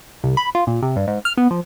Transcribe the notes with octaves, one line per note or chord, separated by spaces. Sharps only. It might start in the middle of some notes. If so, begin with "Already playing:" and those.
C2
B5
F4
A#2
C3
G2
G#2
F6
B3
F3